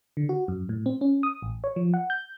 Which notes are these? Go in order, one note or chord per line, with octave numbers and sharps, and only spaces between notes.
D3
F#4
F#2
A2
C4
C#4
D#6
A1
C#5
F3
F#5
G6